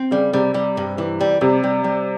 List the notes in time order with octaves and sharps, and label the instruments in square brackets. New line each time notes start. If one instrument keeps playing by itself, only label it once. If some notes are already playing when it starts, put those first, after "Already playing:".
Already playing: [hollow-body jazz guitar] C4
[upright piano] C#3 [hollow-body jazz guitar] G3
[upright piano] C3 [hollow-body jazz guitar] G3
[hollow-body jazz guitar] G3
G2
E3
G3
[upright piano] C3 [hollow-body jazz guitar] G3
[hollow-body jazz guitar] G3
G3